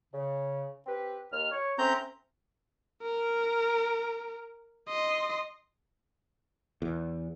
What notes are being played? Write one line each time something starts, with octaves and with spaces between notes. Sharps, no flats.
C#3
C4 G4 B4
D#2 F6
C#5
A3 C4 C#4 A#5 G6
A#4
D#5 C6
E2